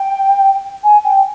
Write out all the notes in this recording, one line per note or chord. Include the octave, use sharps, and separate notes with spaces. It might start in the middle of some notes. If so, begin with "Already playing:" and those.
Already playing: G5
G#5
G5